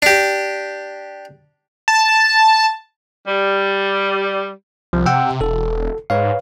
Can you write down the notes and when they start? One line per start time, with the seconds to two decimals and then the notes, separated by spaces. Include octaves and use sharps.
0.02 D4 G4
1.88 A5
3.28 G3
4.93 C2 F3
5.06 C3 F#5 G5 E6
5.41 E1 A4
6.10 G#2 B4 C#5 F5